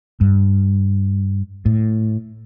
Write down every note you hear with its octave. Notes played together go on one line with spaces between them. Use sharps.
G2
A2